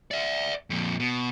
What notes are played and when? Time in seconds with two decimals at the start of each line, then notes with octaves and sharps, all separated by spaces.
0.11 D5 E5
0.70 F2 A#2
1.00 B2